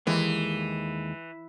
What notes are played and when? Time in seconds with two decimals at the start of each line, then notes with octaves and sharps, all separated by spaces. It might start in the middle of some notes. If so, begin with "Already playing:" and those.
0.07 D#2 E3 G#3 A#3